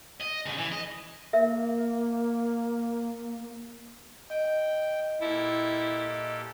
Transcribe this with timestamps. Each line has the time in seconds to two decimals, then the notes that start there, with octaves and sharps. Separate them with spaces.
0.20 D#5
0.46 D2 C#3
0.58 E3
0.72 D#5
1.33 A#3 A#4 E5
4.30 D#5 G5
5.21 A#2 E4 G4 A4